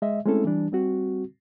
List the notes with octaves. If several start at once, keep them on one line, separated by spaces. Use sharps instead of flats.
G#3 D#5 E5
G#3 A3 C4 C#4 E4 A4
E3 G3 D4
G3 C4 F#4